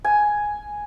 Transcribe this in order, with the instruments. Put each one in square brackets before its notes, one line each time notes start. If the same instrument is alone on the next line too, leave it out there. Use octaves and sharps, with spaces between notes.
[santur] G#5